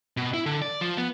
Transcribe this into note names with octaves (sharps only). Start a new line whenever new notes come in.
B2
E4
D3
D5
F3
B3